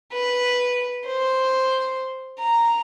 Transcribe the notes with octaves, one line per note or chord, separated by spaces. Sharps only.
B4
C5
A#5